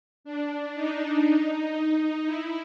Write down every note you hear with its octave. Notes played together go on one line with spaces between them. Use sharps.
D4
D#4
E4